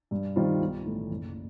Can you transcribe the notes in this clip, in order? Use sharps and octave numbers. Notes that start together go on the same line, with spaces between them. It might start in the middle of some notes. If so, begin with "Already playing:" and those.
G2
D#3 G3 C4 F4
B1
A2 E3 A3
F#1